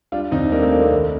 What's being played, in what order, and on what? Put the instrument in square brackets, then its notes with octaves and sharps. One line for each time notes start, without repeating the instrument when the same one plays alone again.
[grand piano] G3 D4 F4
D#2 C4 D#4
G3 A#3 D4
A3 C4
G3 A#3
A3 C4
C2